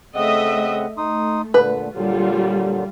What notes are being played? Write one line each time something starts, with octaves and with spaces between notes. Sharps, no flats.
C#3 A3 C4 D#5 E5 F#5
A3 D#4 C6 D#6
A#2 D3 B4
A#2 D3 F#3 G3 F4